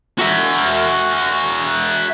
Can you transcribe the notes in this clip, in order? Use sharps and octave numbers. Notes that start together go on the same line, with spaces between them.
F#4 E5